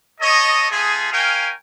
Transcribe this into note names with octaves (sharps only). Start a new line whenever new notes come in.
A4 C#5 D#5
A3 F4 G#4
C#4 A#4 F5 G5 G#5